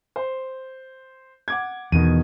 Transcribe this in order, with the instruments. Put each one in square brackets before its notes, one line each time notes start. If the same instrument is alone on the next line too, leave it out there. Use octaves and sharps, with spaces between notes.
[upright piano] C5
F#5 D6 G#6
[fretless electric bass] E2 [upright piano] B2 D#3 D#7